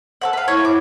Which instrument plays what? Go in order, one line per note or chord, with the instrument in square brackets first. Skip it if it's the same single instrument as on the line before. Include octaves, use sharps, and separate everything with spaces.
[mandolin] A4 C#5 F#5
B4 F5
[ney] E4 [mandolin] C#5
[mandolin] D6